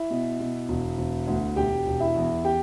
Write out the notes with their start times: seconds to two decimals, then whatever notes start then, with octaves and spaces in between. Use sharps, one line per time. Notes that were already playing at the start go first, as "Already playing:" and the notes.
Already playing: E4 E5
0.10 B2
0.40 B2
0.69 E1
0.98 E1
1.27 D2
1.56 E1 G4 G5
1.87 E1
2.00 E4 E5
2.16 E2
2.45 G4 G5